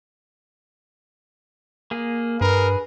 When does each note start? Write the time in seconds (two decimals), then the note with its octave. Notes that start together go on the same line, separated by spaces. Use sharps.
1.91 A#3 G#4
2.41 G2 G#4 A#4 B4